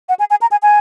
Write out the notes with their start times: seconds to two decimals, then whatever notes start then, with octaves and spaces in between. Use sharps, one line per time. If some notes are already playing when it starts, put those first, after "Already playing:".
0.09 F#5
0.19 G#5
0.30 G#5
0.41 A#5
0.51 G#5
0.62 G#5